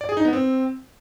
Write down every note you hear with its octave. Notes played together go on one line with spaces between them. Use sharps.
D5
G#4
D#4
B3
C4